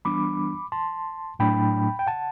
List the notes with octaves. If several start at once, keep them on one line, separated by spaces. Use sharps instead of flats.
E3 G3 B3 D4 B5 D6
A5 C6
A2 F#3 A3 D4 G5 B5
G5
F#5 A5